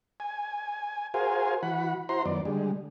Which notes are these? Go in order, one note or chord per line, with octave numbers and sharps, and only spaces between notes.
G#5
F#4 G#4 A#4 C5 F5 G#5
E3 F#4 F#5 B5
E4 F#4 C5 A#5 C6
F#2 D#3 B3 D5
D3 G3 G#3